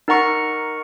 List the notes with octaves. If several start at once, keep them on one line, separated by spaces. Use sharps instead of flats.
D#4 A#4 F#5 A#5 C#6 C#7